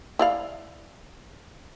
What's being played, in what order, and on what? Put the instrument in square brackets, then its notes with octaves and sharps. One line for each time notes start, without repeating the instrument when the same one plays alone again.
[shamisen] E4 D5 F5